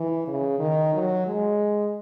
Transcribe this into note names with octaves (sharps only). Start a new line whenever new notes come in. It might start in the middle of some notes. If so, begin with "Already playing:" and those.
Already playing: E3
C#3
D#3
F#3
G#3